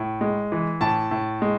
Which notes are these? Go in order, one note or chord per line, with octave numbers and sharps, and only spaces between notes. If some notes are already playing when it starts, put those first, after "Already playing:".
Already playing: A2
G#3
E3
A2 A5
A2
G#3